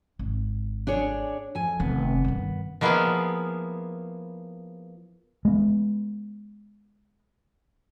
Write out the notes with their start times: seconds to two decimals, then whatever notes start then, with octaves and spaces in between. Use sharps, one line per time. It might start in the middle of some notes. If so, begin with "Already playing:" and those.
0.19 G#1
0.87 D4 G#4 C#5
1.55 F2 G#5
1.80 F1 D#3 B3
2.24 G2 D#3
2.81 F3 A#3 B3 E4 F4 G#4
5.45 G#3 B3